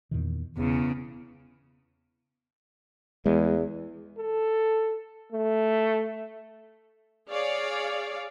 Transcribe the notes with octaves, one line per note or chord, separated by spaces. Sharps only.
E2 A#2 D#3
E1 E2 C#3
E2 G#3
A4
A3
G#4 C#5 D5 F5